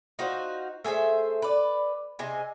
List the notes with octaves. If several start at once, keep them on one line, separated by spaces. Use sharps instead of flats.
D#4 F4 F#4 C5
A3 G#4 C5 E5
B4 D5
C3 G#4 D#5 G#5